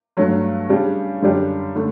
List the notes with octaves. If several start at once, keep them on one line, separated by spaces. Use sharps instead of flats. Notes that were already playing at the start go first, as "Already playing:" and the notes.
G2 F#3 A3
C#3 G3 D4 G4
F#2 D3 G3 D4 G4
D3 A3